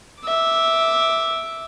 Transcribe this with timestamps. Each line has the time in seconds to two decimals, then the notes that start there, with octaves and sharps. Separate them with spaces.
0.21 E5 D6